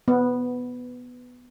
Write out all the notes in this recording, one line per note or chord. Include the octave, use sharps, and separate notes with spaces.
B3